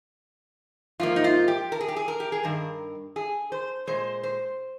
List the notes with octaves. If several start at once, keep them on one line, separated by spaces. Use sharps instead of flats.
G#2 F3 A#3 F4
D#4
F4
G4
A#4
G#4
G4
G#4
A#4
G4
G#4
G2 D#3 A#4
G#4
C5
A#2 G#3 C5
C5